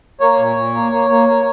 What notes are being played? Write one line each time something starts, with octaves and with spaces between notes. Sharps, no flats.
A#3 C#5
A#2
A#2
A#3
A#3
A#3
A#3